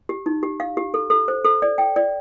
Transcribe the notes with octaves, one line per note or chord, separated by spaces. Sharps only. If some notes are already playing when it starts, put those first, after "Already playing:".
G4
D#4
G4
F5
G4
A4
A4
C5
A4
D5
G5
D5